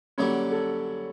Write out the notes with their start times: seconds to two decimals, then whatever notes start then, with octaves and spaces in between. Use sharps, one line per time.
0.18 F#2 D3 G3 A#3 C#4 C#5
0.52 A4